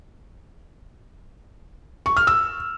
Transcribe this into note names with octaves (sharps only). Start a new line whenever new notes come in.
C#6
F6
E6